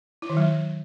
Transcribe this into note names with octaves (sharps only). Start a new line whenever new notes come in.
E4
D#3
F#3